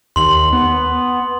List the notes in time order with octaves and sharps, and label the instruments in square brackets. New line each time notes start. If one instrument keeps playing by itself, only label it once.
[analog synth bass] D#2 [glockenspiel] C6 F#7
[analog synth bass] B3